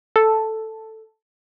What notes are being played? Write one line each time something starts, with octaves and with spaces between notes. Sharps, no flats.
A4